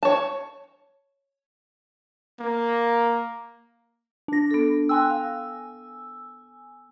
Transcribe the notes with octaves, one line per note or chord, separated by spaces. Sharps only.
C#5 A5
A#3
D4 A#6
B3 A4
G5 G#5 C6 E6 F#6
F5